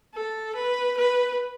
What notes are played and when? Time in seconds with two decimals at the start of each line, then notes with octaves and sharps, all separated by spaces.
0.14 A4
0.55 B4
0.97 B4